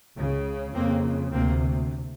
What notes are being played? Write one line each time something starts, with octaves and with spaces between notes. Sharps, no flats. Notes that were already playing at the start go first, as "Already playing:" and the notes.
C#2 C#3
F2 C#3 A#3 C4
D2 C3 A#3 C4